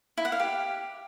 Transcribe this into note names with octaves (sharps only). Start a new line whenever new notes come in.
E4
F#5
F5
G4